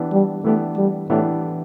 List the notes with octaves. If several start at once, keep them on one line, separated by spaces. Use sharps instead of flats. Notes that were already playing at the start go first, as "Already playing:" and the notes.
Already playing: E3 B3 D4 G4
G3
E3 A3 B3 D4 G4
G3
A2 E3 B3 D4 G4